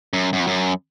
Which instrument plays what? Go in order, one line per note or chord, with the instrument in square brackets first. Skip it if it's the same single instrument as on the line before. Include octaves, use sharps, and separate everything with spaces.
[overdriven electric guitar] F#2
F#2
F2
F#2